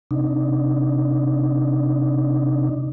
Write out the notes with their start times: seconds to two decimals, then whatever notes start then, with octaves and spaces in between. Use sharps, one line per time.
0.11 C3 D4 D#4